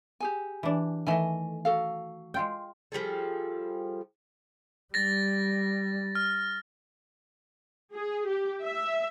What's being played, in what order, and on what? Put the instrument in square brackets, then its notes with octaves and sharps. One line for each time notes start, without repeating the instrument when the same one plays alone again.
[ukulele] G4 G#4 G#5
[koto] E3 D4
[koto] D#3 E3 A3 [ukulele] D#5 G#5
[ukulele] F#4 A4 F5
[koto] G#3 F4 G5
[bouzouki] F3 G3 G#4 A4
[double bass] G3 [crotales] A6 A#6
[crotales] F6
[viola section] G#4
G4
E5